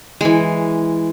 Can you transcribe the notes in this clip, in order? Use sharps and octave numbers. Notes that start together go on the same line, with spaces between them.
E3 G#3